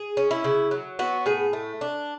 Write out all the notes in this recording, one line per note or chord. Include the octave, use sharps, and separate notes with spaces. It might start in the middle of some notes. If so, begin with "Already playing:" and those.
Already playing: G#4
C#4
E4
C#3
F#3
B3 F#4
A2 G#4
A3
D4